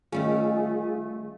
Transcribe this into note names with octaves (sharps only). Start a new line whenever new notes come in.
D#3 G3 A3 C#4 F4 G#4